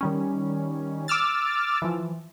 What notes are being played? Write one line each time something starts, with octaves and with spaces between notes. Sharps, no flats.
D#3 G3 C#4
D6 E6 F6 A6
E3 F3